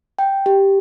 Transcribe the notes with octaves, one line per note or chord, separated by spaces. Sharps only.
G5
G4